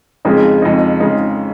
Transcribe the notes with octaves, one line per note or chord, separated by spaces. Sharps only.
F2 C#3 G#3 D#4
F2 C#3 G#3 D#4
F2 C#3 G#3 D#4